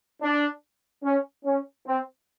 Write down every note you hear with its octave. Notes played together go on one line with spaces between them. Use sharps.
D4
C#4
C#4
C4